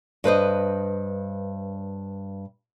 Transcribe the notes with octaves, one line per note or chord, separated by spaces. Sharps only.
G2 B4 C5 D#5